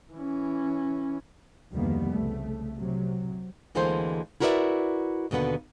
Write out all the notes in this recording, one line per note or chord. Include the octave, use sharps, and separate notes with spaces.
E3 C#4
F1 D2 D#3 G3 A#3 B3
C2 C#3 A3
C3 F#3
D2 E3 G#3 A#3 A4 C5
E4 F#4 A#4 B4 D5 E5
D#2 B2 D3 B3 B4